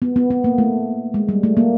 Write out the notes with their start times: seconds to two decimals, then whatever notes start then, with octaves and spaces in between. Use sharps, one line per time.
0.02 B3
0.16 B3
0.31 B3
0.44 A#3
0.58 A3
1.14 G#3
1.29 G3
1.43 A3
1.57 A#3